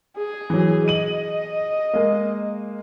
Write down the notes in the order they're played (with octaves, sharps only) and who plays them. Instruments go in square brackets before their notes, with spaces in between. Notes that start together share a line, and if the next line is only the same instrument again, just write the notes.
[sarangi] G#4
[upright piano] E3 F#3
[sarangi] D#5 [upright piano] D#7 F#7
[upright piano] G#3 A#3